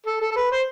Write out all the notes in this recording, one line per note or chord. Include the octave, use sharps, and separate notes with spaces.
A4
A4
A4
B4
C5